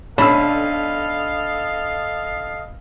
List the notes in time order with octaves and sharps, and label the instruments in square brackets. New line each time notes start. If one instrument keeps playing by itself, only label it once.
[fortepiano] B1 C#4 E6 [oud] D4 [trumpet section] A4 D#5 F5 [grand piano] B5